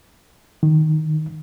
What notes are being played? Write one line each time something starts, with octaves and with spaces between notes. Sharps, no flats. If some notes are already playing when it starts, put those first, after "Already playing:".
D#3